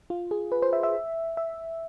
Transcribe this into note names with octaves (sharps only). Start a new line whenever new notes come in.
F4
G#4
B4
C5
E5
E5
E5